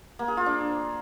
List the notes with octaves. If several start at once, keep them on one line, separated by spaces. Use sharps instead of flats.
A#3
G#4
F4
D4